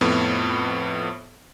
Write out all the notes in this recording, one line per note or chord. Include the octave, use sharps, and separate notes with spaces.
F2 A2 B3